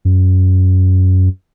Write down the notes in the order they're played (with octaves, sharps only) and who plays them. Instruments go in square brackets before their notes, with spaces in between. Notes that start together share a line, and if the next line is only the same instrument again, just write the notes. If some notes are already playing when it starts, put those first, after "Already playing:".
[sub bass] F#2